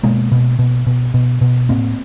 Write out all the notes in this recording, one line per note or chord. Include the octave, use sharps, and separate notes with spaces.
B2 G#3 A#3
B2
B2
B2
B2
B2
A2 A#3 C4